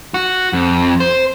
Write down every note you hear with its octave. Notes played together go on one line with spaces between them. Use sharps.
F#4
F2
C5